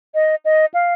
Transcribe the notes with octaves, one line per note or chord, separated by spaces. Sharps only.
D#5
D#5
F5